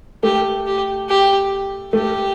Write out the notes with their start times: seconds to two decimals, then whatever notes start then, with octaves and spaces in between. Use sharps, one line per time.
0.23 A3 G4
0.66 G4
1.09 G4
1.93 A3 G4